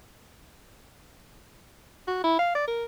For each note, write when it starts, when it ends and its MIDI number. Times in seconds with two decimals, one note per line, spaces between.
2.08 2.21 66
2.24 2.39 64
2.39 2.51 77
2.55 2.68 74
2.68 2.85 70